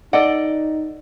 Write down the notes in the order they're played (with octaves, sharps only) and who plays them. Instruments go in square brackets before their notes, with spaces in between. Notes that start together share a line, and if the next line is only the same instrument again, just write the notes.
[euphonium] D#4 [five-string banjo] A4 D#5 F#5 [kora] D5